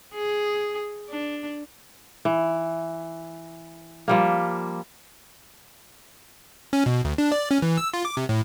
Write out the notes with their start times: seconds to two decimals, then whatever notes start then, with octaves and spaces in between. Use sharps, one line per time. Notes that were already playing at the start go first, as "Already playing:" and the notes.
0.14 G#4
1.10 D4
2.25 E3
4.08 F3 G3 A#3
6.73 C#4
6.86 B2
7.05 D2
7.18 D4
7.32 D5
7.51 C#4
7.62 E3
7.77 E6
7.94 F4
8.05 D6
8.17 C3
8.29 A2